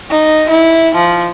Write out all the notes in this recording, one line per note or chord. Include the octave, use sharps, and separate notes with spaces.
D#4
E4
F3